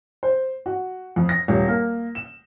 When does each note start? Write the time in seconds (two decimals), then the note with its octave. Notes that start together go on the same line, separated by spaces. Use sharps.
0.23 C5
0.66 F#4
1.16 F2
1.29 A#6
1.48 D#1
1.68 A#3
2.15 E7